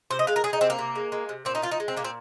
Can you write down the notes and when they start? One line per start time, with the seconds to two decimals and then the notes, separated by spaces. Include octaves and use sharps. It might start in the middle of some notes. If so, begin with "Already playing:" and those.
0.11 C3 C5
0.19 D#5
0.27 G#3 F5
0.36 A#4
0.44 G#3 G#4
0.53 D#4
0.61 C3 C4
0.70 A#3
0.78 C3
0.95 G#3
1.12 G#3
1.29 C3
1.45 A#2 C4
1.55 D#4
1.62 F3 F4
1.71 D#4
1.80 G#3
1.88 C4
1.97 A#2 A#3
2.05 C4